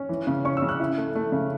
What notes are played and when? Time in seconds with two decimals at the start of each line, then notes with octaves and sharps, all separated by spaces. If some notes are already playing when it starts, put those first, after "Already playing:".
Already playing: C#4
0.09 E3
0.27 C#3
0.45 C#4 C#6
0.57 E6
0.62 C#3
0.69 F#6
0.80 E4
0.98 A3
1.15 A3
1.32 C#3